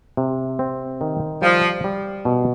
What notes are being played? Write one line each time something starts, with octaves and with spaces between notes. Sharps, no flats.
C3
C4
D#3
F3 G3
G3
B2